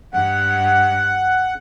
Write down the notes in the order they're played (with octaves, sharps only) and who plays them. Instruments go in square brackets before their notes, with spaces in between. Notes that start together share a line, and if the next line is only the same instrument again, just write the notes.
[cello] G2 [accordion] F#5